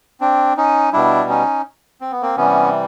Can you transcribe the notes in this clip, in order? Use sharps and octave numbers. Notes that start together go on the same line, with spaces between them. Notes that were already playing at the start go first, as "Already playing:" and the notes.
C4 D4
C#4 D#4
B2 G3 D4 E4
C#4 D#4
C4
B3
A#3 C4
C3 E3 G3 B3 C#4